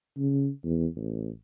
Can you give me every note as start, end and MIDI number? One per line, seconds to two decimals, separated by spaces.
0.18 0.49 49
0.64 0.87 40
0.96 1.30 33